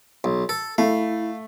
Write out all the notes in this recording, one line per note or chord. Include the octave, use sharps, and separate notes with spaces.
B1
A4
A3 E4 F5